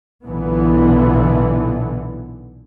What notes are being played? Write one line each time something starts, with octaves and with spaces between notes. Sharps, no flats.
B1 A#2 D3 E3 B3